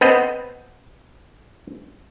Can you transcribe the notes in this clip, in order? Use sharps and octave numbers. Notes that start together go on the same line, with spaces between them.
B3 C4 B4 D#5